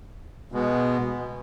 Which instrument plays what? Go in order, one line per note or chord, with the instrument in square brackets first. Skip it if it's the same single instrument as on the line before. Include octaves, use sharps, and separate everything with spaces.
[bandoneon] B2 G#3 B3